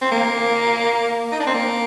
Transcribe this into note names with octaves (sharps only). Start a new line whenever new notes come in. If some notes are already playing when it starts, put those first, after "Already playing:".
C4
A#3
D#4
D4
C4
A#3